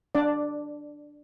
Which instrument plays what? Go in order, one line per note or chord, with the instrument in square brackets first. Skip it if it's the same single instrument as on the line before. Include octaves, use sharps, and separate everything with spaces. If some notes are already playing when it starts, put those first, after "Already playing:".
[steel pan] D4 D5